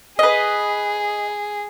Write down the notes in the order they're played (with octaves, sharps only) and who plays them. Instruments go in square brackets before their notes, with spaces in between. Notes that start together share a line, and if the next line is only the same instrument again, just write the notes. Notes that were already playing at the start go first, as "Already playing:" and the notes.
[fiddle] G#4 [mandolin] B4 D#5